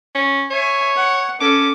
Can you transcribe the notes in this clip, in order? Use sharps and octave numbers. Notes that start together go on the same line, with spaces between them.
C#4
C#5 E5 G#5
F#5
C#4 A4 D6